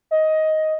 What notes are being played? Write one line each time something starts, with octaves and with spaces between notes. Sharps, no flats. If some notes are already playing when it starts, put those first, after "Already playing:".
D#5